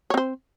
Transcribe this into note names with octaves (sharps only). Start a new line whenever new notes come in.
C4 C5 C#5